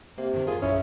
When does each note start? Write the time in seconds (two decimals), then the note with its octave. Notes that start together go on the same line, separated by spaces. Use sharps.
0.18 C3 A#3
0.33 G2 D#3
0.47 F#2 A#3 F4 G#4
0.62 A#1 F#2 C#4 E4